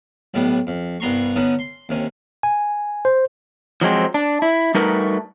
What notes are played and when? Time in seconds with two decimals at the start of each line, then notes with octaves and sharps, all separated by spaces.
0.34 B1 A2 G3 B3
0.67 F2
1.00 C2 G2 B3 A#5 C6 C#6
1.36 D3 B3 C#4 D#4
1.59 C6
1.89 D#2 C3 C#4
2.43 G#5
3.05 C5
3.81 F3 F#3 G#3 C4
4.14 D4
4.42 E4
4.75 G3 A3 D#4 F#4 A#4 B4